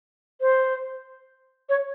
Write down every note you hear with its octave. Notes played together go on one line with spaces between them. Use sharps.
C5
C#5